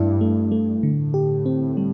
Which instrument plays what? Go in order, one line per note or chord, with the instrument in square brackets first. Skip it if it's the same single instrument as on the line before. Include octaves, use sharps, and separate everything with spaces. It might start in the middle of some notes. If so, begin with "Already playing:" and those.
Already playing: [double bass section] G2 [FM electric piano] A3 E4
[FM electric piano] A3
A3
[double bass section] A2 [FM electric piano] D3
[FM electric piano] G4
C4
G3